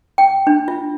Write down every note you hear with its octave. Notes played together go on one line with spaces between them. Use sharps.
G5
D4
F4